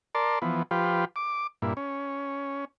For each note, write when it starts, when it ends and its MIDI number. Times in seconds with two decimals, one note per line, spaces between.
0.15 0.39 70
0.15 0.39 74
0.15 0.39 81
0.15 0.39 84
0.42 0.63 52
0.42 0.63 53
0.42 0.63 59
0.71 1.05 53
0.71 1.05 65
0.71 1.05 67
0.71 1.05 71
1.16 1.47 86
1.62 1.73 43
1.62 1.73 46
1.62 1.73 64
1.77 2.65 61